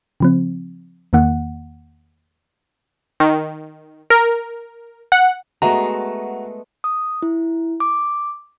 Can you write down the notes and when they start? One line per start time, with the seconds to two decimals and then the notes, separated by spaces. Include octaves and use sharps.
0.20 C#3 F3 C4
1.13 E2 D#3 A#3 F#5
3.20 D#3
4.10 A#4
5.12 F#5
5.62 G#3 A3 B3 F#4 A#5
6.84 D#6
7.22 E4
7.80 D6